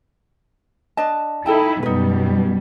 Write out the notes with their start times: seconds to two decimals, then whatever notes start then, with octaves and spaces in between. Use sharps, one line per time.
0.97 D4 D#5 A5
1.46 D#4 E4 A4 G5 A5
1.83 F#2 B2 G3 D#4 B4